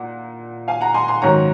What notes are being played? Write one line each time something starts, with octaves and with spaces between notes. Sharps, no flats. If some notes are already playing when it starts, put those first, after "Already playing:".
Already playing: A#2 F#5
F5 G#5
F#5 A#5
G#5 C6
G#5 C6
G#2 D#3 F#3 C#4 A#5 C#6